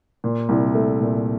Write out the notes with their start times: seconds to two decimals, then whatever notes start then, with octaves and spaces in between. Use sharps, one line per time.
0.24 A#2
0.49 C2
0.75 A3
1.00 A#2